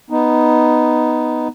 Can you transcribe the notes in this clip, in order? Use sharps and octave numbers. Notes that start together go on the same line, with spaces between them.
B3 D#4